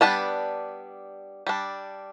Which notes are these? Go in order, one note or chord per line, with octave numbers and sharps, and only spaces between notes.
G3 B3 D4 A5
G3 D4